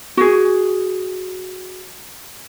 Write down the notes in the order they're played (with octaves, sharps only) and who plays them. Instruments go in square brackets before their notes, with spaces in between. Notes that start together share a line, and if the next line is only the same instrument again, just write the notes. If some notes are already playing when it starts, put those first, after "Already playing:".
[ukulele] F#4 G#4